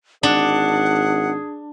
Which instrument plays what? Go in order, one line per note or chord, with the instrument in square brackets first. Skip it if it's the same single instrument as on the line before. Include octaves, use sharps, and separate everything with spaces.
[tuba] G#1 [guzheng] D4 [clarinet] G#4 [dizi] F#5